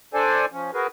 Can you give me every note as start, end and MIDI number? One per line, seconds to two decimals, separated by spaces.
0.14 0.46 62
0.14 0.46 69
0.14 0.46 72
0.14 0.46 74
0.14 0.46 80
0.52 0.71 53
0.52 0.71 61
0.74 0.87 66
0.74 0.87 68
0.74 0.87 70
0.74 0.87 71